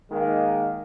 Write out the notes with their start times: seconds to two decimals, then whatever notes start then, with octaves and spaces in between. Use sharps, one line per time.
0.10 D#3 G#3 A#3